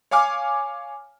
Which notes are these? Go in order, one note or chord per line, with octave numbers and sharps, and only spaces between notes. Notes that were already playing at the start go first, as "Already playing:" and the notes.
C#5 F5 G#5 D6 F6